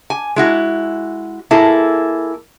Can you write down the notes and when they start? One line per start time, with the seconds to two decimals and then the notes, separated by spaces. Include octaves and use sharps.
0.10 G#5
0.36 G#3 E4 F#4
1.51 A#3 E4 G#4 A4